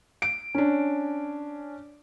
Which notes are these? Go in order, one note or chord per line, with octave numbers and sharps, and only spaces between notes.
D7
C#4 D4